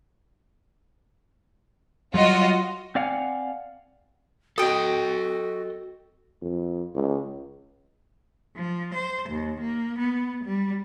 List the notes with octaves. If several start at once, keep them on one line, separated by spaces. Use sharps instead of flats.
F#3 G3 F4 F#4 D#5
C4 D5 F5 F#5 G#5
F#4 A4 D#5 G5 D#6
F2
C#2
F3
C5
D#2
A#3
B3
G3